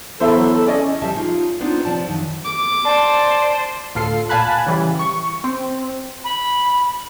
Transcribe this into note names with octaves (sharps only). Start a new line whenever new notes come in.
E2 A4 C5 E5 B5
F#3
A4
C#4 D5 D#5
F3 G3 E5 A5
C#4 D#4 F4 G#4
G#3 B3 C4 D4 D#4 F4
C3 F3 D5 A5
F#2 D#3 E3
D6
C5 D5 A5
D2 A2 F4 A4 C7
A#2 F5 G#5 A5 B5 F#6
C#3 E3 G3
C#6
C4
B5